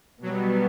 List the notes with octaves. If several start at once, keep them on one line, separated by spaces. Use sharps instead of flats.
B2 F#3 G3 B3